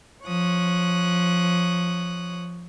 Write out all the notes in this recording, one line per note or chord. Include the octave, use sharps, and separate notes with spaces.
F3 C#5 D#6 F#6